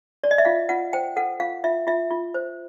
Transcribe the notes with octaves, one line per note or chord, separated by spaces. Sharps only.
D5
D#5
E5
F4 F5
F4 F#5
C5 G5
A4 F#5
F4 F5
F4 E5
F4 E5
F4
C5